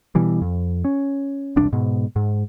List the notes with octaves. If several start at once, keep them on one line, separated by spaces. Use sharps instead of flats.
B2 E3 G3
F2
C#4
E1 C2 D4
G#2 B2
G#2